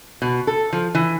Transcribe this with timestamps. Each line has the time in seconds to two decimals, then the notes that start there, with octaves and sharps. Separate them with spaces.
0.22 B2
0.47 A4
0.73 F3
0.95 E3